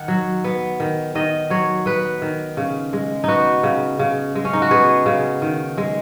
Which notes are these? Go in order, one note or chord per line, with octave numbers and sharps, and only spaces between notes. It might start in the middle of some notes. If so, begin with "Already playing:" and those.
Already playing: D#3 F#5
F#3
B3
D#3
D#3 D#5
F#3 C#5
B3 B4
D#3
C#3
G#3
B3 D#4 F#4
C#3
C#3
G#3
C#4
D#4
F#4
B3 G#4
C#3
D#3
G#3